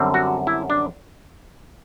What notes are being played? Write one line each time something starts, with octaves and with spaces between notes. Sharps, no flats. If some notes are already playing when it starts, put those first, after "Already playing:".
Already playing: F#2 D3 G3 C4
F#4
E4
D4